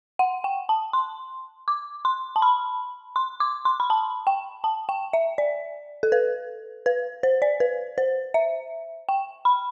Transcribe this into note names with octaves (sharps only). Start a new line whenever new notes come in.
F#5
G5
A5
C6
D6
C6
A5
B5
C6
D6
C6
B5
A5
G5
A5
G5
E5
D5
A4
B4
B4
C5
D5
B4
C5
E5
G5
B5